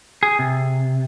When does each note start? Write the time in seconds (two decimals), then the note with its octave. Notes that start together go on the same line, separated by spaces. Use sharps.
0.23 G#4
0.39 C3